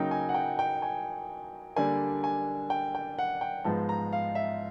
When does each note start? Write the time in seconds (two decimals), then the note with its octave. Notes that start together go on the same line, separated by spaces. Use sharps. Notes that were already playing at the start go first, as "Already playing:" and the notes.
Already playing: C#3 F#3 A#3 D#4 G5
0.11 G#5
0.29 F#5
0.34 G5
0.59 G5
0.82 G#5
1.76 D3 G3 A#3 D4 G#5
2.24 G#5
2.70 G5
2.95 G5
3.19 F#5
3.41 G5
3.64 G#2 F3 G#3 B3 A5
3.89 A#5
4.13 F5
4.35 E5